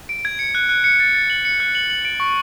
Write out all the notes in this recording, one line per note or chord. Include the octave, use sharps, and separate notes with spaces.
D7
G#6
C#7
F#6
F#6
C#7
A6
A6
F#7
C#7
F#6
F#7
F#7
D7
C#6